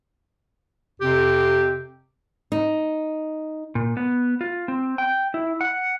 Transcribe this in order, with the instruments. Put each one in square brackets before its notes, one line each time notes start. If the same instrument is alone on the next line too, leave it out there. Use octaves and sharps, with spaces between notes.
[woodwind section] F2 C3 C4 G4
[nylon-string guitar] D#4
[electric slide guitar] A#2
B3
F4
C4
G5
E4
F#5